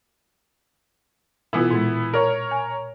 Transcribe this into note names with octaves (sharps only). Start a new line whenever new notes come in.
B2 E3 B3 E4 F4
A#2 G#3
A#4 C#5
G#5